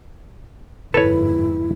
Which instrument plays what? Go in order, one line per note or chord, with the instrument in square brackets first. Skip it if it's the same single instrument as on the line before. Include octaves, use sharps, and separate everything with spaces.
[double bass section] G1 F2 G#2 [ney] E4 [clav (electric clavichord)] A4 C#5 [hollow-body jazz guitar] B4